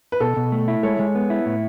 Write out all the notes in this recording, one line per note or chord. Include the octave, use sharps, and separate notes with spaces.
B4
B2 A4
B2
A3
E4
G#3 A4 C#5
G#3
B3
E4
A2